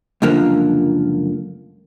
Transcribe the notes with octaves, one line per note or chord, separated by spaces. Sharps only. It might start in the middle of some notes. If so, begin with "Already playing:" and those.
C#2 F#2 D3 F3 A#3